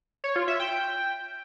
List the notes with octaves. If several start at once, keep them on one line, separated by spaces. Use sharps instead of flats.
C#5
F4
E5
G5